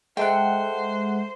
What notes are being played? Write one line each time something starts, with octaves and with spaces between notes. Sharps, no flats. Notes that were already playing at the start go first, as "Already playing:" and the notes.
G#3 A4 C5 E5 F#5 G5